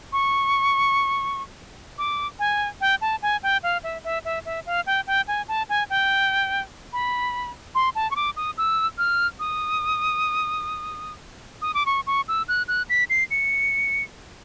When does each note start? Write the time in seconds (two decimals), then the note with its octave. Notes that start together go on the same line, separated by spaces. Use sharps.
0.13 C#6
1.98 D6
2.39 G#5
2.81 G5
3.01 A5
3.22 G#5
3.43 G5
3.63 F5
3.84 E5
4.04 E5
4.25 E5
4.45 E5
4.66 F5
4.86 G5
5.07 G5
5.28 G#5
5.48 A5
5.69 G#5
5.90 G5
6.93 B5
7.75 C6
7.95 A5
8.11 C#6
8.16 D6
8.36 D#6
8.58 E6
8.98 F6
9.40 D#6
11.62 D#6
11.74 D6
11.86 C#6
12.07 C#6
12.28 E6
12.48 F#6
12.68 F#6
12.90 B6
13.10 C7
13.31 C#7